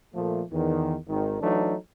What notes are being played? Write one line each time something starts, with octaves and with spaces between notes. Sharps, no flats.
A#2 F3 A3
E2 D#3
G#1 D#3
E3 F#3 A3 D4 D#4